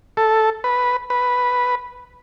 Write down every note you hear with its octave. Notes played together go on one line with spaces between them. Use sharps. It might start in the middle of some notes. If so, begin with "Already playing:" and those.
A4
B4
B4